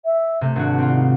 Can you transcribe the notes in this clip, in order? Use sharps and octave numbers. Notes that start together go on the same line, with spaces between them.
E5
C3 A3
G#1 D4 F#4
C4 F4
D#4